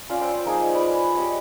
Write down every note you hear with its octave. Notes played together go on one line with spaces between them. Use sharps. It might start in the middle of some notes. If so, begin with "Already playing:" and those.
C#4 F4 D5 F5
C5 F#5 G5 E6
F3 A#3 D#4 G#4
B4 D5
G4 C#5 D#5 F#5